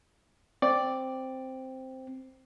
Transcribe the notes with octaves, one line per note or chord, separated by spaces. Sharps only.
C4 D5